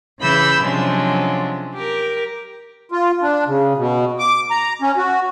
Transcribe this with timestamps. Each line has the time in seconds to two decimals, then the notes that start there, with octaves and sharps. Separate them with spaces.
0.20 C#3 E3 B5 E6 G6
0.63 C3 F3 F#3 G#3 C#4 D4
1.73 G4 A#4
2.92 F4
3.22 D4
3.47 C#3
3.77 B2
4.19 D6
4.51 A#5
4.82 C#4
4.97 F#4